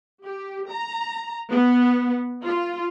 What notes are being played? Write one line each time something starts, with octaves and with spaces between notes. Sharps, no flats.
G4
A#5
B3
F4